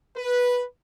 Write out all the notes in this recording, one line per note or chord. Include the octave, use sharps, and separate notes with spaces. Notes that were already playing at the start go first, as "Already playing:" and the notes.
B4